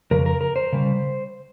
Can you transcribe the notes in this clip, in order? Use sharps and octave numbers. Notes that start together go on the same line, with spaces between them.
F2 C#3 A#4
A#4
A#4
C5
C#3 G3